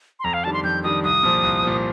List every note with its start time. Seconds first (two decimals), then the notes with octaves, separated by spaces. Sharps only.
0.20 C6
0.24 F2 A#5
0.34 F5
0.44 D#3 G3 D4 A5
0.53 C6
0.64 F2 G6
0.83 D#3 G3 D4 D#6
1.04 C2 D#6
1.23 A#2 F3
1.43 C2
1.63 A#2 F3